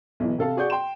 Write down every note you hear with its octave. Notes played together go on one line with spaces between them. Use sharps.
B1 E3
C3 A4 F5
F#4 G#4 D5 F#5 C#6 G6
G5 C6 E7